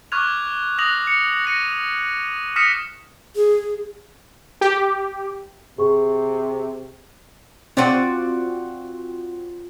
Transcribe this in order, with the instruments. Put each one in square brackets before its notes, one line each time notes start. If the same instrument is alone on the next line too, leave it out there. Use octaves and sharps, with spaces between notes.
[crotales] C#6 D6 F6 F#6 G#6 F7
D#6 F#6 A#6 F7 F#7
C#7
A#6 C#7 D#7
D#6 F6 A#6 B6 C#7 E7
[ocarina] G#4
[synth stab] G4
[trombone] C3 [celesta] G#4 C#6
[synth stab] C4 [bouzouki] F4 F#4 D5